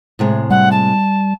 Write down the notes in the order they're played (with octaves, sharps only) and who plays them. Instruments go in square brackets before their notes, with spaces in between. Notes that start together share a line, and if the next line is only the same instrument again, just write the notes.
[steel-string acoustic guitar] A2 C3 G#3
[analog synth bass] G3 [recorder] F#5
[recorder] A5